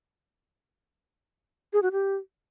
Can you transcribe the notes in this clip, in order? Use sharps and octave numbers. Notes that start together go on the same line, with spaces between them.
G#4
F#4
G4